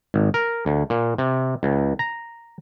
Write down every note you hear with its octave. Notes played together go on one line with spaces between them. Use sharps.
G#1
A#4
D2
A#2
C3
C#2
A#5